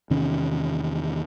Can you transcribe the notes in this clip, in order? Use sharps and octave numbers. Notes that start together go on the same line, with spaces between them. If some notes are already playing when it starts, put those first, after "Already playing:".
E2 C3 D#3 C#4